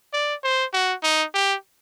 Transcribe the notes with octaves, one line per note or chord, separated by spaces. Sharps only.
D5
C5
F#4
D#4
G4